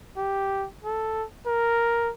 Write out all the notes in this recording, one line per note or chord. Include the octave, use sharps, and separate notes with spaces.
G4
A4
A#4